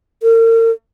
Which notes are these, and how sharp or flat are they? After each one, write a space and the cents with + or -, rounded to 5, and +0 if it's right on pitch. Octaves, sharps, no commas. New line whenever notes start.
A#4 -40